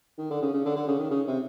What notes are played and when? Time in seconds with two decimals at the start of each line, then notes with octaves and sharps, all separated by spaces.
0.18 D#3
0.30 D3
0.42 C#3
0.53 C#3
0.65 D3
0.76 D3
0.88 C#3
0.99 D#3
1.11 C#3
1.27 C3